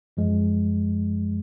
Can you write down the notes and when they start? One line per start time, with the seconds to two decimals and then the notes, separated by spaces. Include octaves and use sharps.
0.17 F#2 F3 G#3